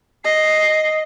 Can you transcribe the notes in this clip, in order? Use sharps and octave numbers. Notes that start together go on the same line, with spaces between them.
D#5 C7